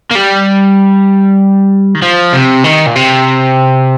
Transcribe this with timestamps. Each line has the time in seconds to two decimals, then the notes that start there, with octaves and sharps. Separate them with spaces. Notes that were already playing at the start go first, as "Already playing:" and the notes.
0.11 A#3
0.15 G3
1.95 D#3
2.02 F3
2.33 C3
2.64 D#3
2.86 A#2
2.95 C3